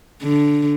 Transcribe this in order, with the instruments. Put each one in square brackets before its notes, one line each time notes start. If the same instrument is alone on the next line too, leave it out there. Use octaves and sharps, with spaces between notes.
[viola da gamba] D3